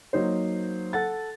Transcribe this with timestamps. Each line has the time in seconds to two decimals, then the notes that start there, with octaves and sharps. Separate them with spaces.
0.13 F#3 A#3 D#4 C5
0.93 A4 F#5 A6